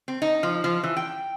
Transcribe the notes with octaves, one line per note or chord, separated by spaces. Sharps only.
C4
D#4
F3
F3
E3
G5